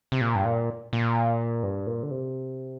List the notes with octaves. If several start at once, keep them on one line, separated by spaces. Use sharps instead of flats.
C3
A#2
G2
A#2
A#2
G2
A#2
D3
C3